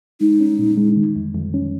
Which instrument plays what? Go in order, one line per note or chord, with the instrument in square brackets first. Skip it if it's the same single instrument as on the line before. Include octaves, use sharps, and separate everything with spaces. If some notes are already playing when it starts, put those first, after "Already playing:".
[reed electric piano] G#3 [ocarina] D#4
[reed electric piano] C#4
A#2
G#3
D#3
F2
F2
C#4